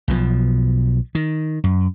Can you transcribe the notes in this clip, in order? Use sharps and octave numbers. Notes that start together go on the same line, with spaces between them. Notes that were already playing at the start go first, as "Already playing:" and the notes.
B1 B2 E3 F3
D#3
F#2